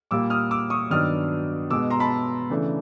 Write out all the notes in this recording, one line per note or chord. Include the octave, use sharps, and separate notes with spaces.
A#2 G3 A#3 D6 E6
D#6 F6
D6 E6
C#6 D#6
G2 D#3 F#3 B3 D4 D#6 F6
B2 G#3 B3 D6 E6
A#5 C6
A5 B5
C#3 E3 A3 D4